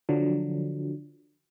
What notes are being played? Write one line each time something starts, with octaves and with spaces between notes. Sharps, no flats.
D3 F3 F#3